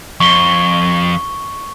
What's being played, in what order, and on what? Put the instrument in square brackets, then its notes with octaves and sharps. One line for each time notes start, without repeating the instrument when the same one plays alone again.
[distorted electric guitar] F2 [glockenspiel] C#6 G7